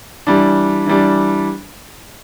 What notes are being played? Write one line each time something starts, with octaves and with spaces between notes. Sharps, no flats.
E3 G3 D4
E3 G3 D4